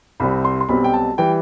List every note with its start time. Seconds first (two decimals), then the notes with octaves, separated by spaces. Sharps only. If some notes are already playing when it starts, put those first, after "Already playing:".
0.20 C2 C3 G3 C4 B5
0.45 C6
0.61 C6
0.69 B1 B2 G3 C4 B5
0.84 G5
0.94 A5
1.18 E3 G3 G5